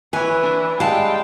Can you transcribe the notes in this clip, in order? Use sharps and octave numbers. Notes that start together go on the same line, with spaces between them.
E3 B4 C#5 G#5
D4 E5
G3 G#3 F5 G5 A5